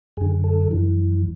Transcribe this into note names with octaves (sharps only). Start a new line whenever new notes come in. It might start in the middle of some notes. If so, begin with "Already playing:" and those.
F#2 D3 G#4
A4
F#2 E3